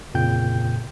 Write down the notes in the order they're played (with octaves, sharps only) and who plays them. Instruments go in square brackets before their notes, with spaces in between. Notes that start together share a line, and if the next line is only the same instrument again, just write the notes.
[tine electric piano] F2 A#2 C#3 G5 G6